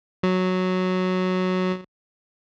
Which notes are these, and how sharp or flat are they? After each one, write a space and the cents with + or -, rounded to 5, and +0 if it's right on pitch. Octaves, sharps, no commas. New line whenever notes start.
F#3 -5